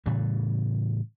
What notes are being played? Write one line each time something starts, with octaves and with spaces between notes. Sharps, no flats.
A2 C#3 E3 G3